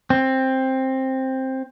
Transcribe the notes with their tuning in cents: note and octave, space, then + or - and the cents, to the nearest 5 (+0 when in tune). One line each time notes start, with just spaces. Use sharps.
C4 +10